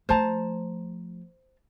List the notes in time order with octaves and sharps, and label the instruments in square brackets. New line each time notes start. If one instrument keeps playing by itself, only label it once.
[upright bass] F3 A3 [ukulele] C5 A5 A#5